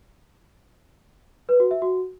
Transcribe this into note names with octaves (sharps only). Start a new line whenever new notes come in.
B4
F#4
E5
F#4